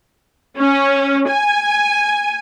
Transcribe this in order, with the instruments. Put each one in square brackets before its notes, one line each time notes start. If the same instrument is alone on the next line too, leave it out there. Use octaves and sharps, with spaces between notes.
[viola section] C#4
G#5